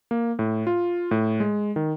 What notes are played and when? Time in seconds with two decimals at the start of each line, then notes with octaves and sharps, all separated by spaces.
0.11 A#3
0.39 A2
0.67 F4
1.11 A2
1.40 G#3
1.76 D#3